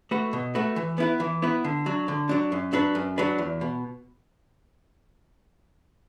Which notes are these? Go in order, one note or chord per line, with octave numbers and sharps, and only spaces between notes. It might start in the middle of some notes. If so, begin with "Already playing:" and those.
A3 F#4 B4
B2
A3 F#4 B4
E3
B3 E4 B4
E3
B3 E4 B4
D3
F#3 D4
D3
F#3 D4
F#2
F#3 D4 B4
F#2
F#3 D4 B4
E2
B2